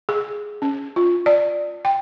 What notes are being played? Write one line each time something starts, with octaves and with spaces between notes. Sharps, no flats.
G#4
C#4
F4
D5
G5